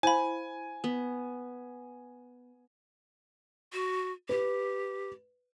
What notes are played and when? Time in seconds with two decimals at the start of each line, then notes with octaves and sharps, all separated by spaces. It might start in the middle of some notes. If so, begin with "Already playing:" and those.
0.03 E4 C5 F5 G#5 B5
0.84 B3
3.73 F#4
4.29 G4 B4